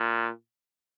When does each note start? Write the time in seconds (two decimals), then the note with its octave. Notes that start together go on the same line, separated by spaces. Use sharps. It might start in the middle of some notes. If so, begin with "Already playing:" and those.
Already playing: A#2